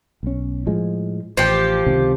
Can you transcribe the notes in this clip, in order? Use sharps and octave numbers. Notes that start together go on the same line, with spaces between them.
B1 C#4
A2 F3 G#3
A1 F3 G4
C#2 C3 D#3